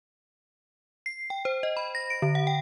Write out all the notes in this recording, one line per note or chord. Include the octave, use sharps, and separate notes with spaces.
C7
G5
C5
D#5
B5
A#6
D7
D3
F#5
G5